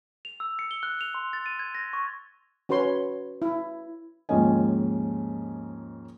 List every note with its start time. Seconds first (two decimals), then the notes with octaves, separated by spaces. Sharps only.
0.25 F7
0.40 E6
0.59 C#7
0.71 G7
0.83 F#6
1.01 F7
1.14 C6
1.33 A6
1.46 D#7
1.59 G#6
1.75 A#6
1.93 C#6
2.69 C#4 F#4 B4 C#5 C6
3.42 E4
4.29 D#2 G#2 F3 C#4 D#5 G#5